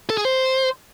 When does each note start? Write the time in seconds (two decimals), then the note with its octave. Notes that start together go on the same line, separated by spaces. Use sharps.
0.10 A4
0.17 G#4
0.25 C5